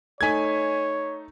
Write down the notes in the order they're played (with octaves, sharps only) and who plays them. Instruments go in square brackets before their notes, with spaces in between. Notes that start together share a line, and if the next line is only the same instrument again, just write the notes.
[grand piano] A3 D#4 B6 [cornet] C#5 [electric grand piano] G#5 G#6